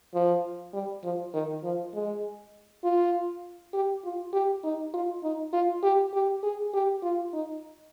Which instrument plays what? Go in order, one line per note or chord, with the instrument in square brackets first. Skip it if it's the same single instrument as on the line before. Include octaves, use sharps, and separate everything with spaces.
[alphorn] F3
G3
F3
D#3
F3
G#3
F4
G4
F4
G4
D#4
F4
D#4
F4
G4
G4
G#4
G4
F4
D#4